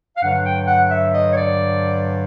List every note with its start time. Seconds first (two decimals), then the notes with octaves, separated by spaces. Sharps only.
0.16 F5
0.21 G2 D3 F#3 F#5
0.44 G5
0.68 F#5
0.90 E5
1.14 D#5
1.31 C#5
1.37 D5